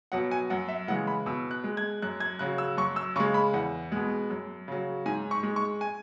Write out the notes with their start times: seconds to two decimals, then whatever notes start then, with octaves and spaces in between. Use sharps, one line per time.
0.12 B2 F#3 F#5
0.31 G#5
0.50 F#2 F#5
0.68 E5
0.88 C#3 E3 G#3 F#5
1.07 B5
1.26 B2 E6
1.51 F#6
1.64 G#3
1.77 G#6
2.02 F#2 F#6
2.20 G#6
2.39 C#3 F#3 F#6
2.58 E6
2.77 F#2 C#6
2.96 E6
3.16 C#3 C#6
3.20 G#3
3.34 B5
3.54 E2 F#5
3.92 B2 G#3
4.30 F#2
4.68 C#3 F#3
5.06 G#2 G#5
5.31 C#6
5.43 G#3
5.56 C#6
5.81 G#5